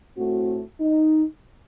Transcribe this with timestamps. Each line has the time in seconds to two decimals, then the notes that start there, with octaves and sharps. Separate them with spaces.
0.17 A2 A3 C4 F#4
0.80 D#4